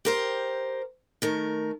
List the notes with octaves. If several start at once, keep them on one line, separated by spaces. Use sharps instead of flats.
G4 A#4 C5
D#3 A3 A#4